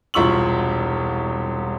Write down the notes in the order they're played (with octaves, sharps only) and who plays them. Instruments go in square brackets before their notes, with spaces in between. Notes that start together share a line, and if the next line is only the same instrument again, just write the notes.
[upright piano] E1 C2 F4 C#6 E6 F#7